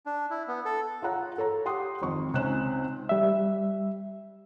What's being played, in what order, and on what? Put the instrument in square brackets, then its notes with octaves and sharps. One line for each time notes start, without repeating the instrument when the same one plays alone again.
[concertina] D4
E4
B3
A4
[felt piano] F4 G#4 C#5 F#5 A#5
A4 C#5 A#5
G4 F#5 G5 C6 D#6
G#1 F2 C#6
C#2 C4 C#4 D#4 F#6 E7
[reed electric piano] G3 E5